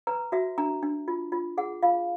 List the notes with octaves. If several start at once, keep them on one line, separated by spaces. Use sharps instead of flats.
B4 A#5
F#4 E5
D4 A#5
D4
F4
F4
G#4 F#5
F4 F5